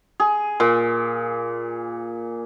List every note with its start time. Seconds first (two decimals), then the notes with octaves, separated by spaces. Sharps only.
0.20 G#4
0.60 A#2